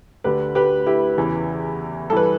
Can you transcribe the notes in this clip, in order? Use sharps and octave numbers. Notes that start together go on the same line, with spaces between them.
D2 D3 G4 B4
G4 B4
E4 G4
E2 C#3 E3
G2 E3 A4 B4